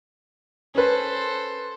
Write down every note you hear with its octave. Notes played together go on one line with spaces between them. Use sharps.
C#4 A4 B4 C5